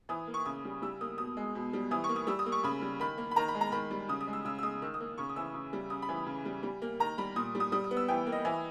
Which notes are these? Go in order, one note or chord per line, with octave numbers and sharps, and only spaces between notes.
E3 D#6
A#3
C#6
C#3 D#6
G3
G3 E6
A#3 D#6
B2 D#6
G#3
B2
G3
E3 D#6
C#6
A#3
D#6
G3 E6
D#6
A#3
C#6
C#3 B5
G3
D#3 B5
A#3
B5
D#3 A#5
B5
G#3
A#5
D#3 B5
G3
C#3 D#6
D#6
G#3
E6
C#3 E6
E6
G#3 D#6
D#3 E6
D#6
A#3
C#3 C#6
D#6
E3 E6
C#3
G3
C#3 D#6
B5
E3
C#3
G3
G3
A#3
D#3 A#5
G3 B5
A#2 D#6
G3
D#6
G3 D#6
D#6
B3
E6
E3 G5
A#3
D#5
E3